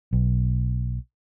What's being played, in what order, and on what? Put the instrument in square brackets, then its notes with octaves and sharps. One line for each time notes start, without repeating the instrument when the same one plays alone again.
[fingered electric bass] B1